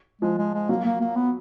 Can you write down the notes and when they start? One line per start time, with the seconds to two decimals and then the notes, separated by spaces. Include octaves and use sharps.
0.22 F3 G#3
0.38 G#3
0.54 G#3
0.69 F#3 A#3
0.85 A#3
1.01 A#3
1.16 B3